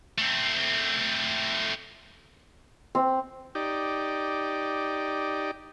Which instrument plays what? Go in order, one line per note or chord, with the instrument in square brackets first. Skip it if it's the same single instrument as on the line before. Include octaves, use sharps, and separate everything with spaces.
[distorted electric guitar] A3 C4
[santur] C4
[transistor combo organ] D#4 G4 D5